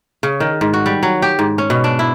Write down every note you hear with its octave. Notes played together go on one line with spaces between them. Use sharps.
C#3
D#3
G#2
F#4
G3
F#3
G4
G#2
C#4
B2
D4
E4